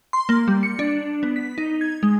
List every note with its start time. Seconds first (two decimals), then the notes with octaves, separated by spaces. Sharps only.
0.13 C6
0.29 A#3
0.48 G3
0.63 C#7
0.79 D4
1.23 B3
1.36 B6
1.58 D#4
1.81 G#6
2.03 G#3